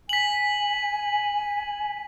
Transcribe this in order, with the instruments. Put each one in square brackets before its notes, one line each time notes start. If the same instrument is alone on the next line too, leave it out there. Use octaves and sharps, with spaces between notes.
[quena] G#5 [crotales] B6 F#7